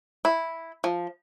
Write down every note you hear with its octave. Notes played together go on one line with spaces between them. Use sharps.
E4
F3